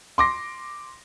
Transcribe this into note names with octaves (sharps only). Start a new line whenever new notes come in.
C6 D6 A#6